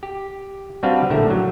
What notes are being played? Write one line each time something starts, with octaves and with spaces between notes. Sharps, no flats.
G4
G3 C4 D4 F#4 B4 F5
A#1 A2 D3 A#4 E5
F#3